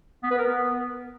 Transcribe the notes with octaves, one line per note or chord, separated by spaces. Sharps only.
B3
B4
A#4
B3